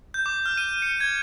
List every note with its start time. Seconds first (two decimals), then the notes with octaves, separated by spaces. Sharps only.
0.14 G6
0.26 D6
0.46 F6
0.58 D#7
0.82 C#7
1.00 G#6